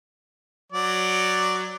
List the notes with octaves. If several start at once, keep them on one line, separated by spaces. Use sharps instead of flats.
F#3 D5